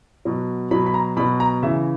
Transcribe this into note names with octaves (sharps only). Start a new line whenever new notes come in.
B2 F#3
B2 F#3 B5
B5
A#5
B2 F#3 B5
A#5
C#3 E3 E5